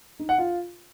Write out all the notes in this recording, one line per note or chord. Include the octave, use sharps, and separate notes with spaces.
D#4
F#5
F4